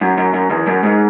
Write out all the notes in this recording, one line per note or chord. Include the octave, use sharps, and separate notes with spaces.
F#2
F#2
F#2
E2
F#2
G#2